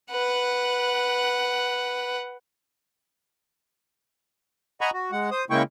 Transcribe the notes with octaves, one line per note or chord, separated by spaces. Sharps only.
B4 F#5
D#5 F#5 G#5 A#5 B5 C#6
F#4
G#3 F#5
C5 D#6
C#3 G#3 A#3 E4 G5 C#6